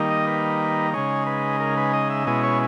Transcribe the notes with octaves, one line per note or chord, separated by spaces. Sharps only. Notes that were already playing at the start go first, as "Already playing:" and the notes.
Already playing: D#3 G3 A#3 D#4
D#5
B4
C#3 G#3 D#4 C#5
B4
A#4
B4
D#5
E5
B2 G#3 C#4 E4 D#5
C#5